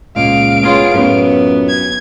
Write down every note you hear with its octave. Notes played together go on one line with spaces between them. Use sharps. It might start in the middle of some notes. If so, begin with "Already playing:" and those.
C#2 A#2 D#5 F5 D7
B3 F4 G#4 C#5
F#2 A2 B3 F4 C#5
G#6